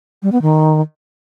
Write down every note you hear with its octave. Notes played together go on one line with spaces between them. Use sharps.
G3
B3
D#3